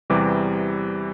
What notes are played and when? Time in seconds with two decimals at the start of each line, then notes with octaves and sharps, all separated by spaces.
0.10 E2 C3 E3 G3 D6